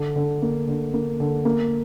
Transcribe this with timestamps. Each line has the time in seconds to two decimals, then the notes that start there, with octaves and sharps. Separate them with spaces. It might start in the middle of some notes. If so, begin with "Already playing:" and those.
Already playing: D3
0.16 D3
0.42 A#3
0.68 D3
0.94 A#3
1.20 D3
1.45 A#3